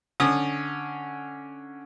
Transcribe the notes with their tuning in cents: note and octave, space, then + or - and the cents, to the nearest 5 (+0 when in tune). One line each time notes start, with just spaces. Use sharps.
D3 +0 C#4 +0 D#6 -25